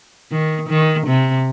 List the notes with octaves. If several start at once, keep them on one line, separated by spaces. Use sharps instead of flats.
D#3
D#3
C3